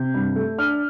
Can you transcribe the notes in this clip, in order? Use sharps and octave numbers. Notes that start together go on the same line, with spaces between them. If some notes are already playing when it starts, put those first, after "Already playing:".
Already playing: C3 G6
G2
A3
D4 F6